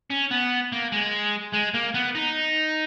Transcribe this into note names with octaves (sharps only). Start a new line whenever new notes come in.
C#4
B3
A#3
G#3
G#3
A#3
B3
D#4